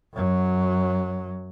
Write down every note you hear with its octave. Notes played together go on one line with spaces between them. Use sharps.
F#2 F#3